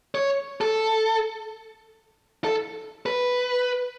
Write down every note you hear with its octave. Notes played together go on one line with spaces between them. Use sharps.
C#5
A4
A4
B4